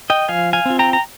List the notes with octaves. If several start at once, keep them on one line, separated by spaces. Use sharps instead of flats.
D#5 G5
F3 F5 G#5
F5 G#5
C4 F4
G5 A#5
A#5